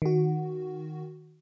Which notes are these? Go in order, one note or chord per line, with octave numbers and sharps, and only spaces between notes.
D#3 F#4